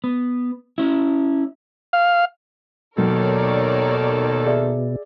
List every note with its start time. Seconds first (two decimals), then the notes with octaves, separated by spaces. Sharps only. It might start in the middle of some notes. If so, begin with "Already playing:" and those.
0.04 B3
0.78 C#4 E4
1.93 F5
2.98 D#2 B2 D#3 F#3 A4 A#4 C#5 D5
4.46 G#4 D5 E5